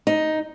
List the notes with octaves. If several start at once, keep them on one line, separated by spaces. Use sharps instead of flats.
D#4